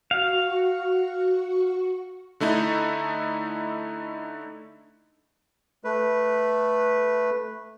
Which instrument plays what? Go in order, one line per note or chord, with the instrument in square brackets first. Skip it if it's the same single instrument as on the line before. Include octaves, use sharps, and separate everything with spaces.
[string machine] F#4 C#6 [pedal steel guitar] F5
[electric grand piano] D3 A3 D#4 E4
[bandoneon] A3 B4